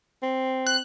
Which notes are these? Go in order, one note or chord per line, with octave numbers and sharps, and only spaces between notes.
C4
F#6